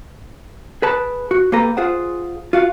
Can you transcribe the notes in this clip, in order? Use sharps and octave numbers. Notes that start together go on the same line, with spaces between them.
G#4 B4 A5
F#4
A#3 G4 A4 B4 A#5
F4 G#4 C5 F#5
F4 F#4 F5